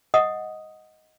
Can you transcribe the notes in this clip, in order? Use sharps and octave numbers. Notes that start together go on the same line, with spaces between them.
D#5 F#5 D#6